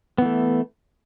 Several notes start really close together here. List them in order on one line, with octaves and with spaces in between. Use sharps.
B3 E3 A3